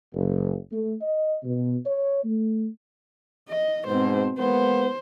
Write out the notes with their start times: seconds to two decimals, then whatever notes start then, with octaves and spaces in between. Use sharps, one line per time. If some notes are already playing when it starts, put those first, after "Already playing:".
0.14 F#1
0.72 A3
1.01 D#5
1.43 B2
1.86 C#5
2.25 A3
3.49 D#5
3.87 G#2 B2 C4 C5
4.38 G#3 A#3 B3 C5